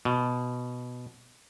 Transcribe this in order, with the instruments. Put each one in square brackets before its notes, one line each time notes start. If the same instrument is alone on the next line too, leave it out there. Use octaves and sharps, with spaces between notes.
[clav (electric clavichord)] B2